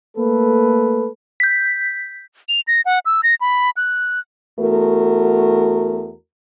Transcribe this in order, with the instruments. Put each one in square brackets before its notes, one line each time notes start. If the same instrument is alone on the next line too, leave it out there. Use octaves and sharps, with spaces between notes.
[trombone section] A3 A#3 A4 B4
[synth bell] G6 B6
[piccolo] F7
A#6
F#5
E6
A#6
B5
F#6
[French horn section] E2 A3 F#4 A#4